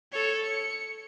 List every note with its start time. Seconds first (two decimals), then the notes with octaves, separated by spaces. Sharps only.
0.12 A4 C#5
0.44 C#7